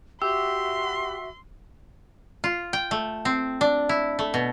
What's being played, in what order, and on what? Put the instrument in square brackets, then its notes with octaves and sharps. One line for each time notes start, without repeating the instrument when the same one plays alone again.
[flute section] F#4 E5 [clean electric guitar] G4 [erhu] C6 [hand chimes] E6
[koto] F4
G5
A3
C4
D4
E4
A3
B2